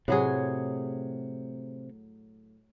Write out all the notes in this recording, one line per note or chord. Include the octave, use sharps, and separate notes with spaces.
A2 C3 F#3 G#4